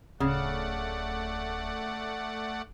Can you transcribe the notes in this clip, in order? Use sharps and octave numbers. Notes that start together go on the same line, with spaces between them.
D1 C#3 A3 D5 F#5